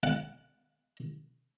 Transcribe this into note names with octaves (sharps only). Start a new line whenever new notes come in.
F#5